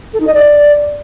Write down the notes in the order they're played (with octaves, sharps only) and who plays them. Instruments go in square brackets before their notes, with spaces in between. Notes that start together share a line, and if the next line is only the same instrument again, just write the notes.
[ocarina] A4
D#4
D#5
D5